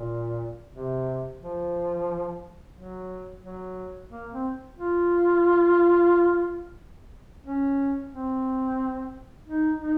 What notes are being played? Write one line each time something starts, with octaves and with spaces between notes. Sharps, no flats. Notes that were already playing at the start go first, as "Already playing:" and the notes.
Already playing: A#2
C3
F3
F#3
F#3
A#3
C4
F4
C#4
C4
D#4
D#4